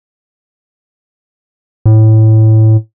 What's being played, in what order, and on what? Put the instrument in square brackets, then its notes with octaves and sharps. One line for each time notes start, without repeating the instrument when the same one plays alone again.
[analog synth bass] A2